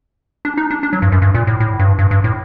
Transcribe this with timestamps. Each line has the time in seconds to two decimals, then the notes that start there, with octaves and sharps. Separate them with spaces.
0.45 D4
0.57 D#4
0.71 D4
0.83 D4
0.93 F#3
1.02 G2
1.12 F#2
1.22 G2
1.35 A#2
1.47 A2
1.60 A2
1.79 G2
1.99 G2
2.11 G2
2.24 A2